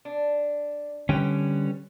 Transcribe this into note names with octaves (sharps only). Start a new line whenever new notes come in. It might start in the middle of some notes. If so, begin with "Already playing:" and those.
D4
D3 G3 C#4 B4 G5